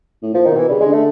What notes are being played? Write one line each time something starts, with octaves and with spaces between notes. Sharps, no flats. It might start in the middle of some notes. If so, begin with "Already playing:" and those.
A2
A#2 F3
D#3
B2
E3
C#3 G3
G#3
D3
A3